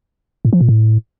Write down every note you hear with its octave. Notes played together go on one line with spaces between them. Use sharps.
A2
F3
A#2
A2